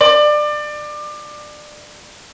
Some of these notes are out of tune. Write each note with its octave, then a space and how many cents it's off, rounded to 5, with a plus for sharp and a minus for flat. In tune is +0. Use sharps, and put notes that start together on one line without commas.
D5 +25